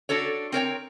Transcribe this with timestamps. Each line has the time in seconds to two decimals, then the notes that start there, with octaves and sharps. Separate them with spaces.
0.09 D4 F#4 A4 C#5
0.52 C4 A#4 C#5 G5